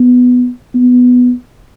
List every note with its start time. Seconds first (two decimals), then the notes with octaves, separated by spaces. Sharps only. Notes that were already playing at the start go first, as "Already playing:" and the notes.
Already playing: B3
0.75 B3